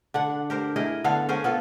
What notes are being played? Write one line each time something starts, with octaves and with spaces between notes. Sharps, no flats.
D3 D4 F#5
G4 A#4 C5
E4 G#4 A#4 D#5
D3 B3 A4 F5
C#4 G#4 A#4 C5
B3 F4 A4